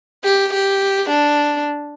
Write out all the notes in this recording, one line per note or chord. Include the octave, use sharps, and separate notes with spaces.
G4
G4
D4